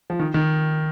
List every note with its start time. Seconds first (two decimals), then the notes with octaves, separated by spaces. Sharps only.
0.10 F3
0.20 D#3
0.34 D#3